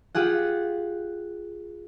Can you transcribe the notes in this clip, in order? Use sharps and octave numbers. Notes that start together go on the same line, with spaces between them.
F4 G4 G#4 F#5